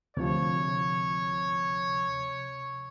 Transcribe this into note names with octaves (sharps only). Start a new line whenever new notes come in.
D2 C3 F3 C#5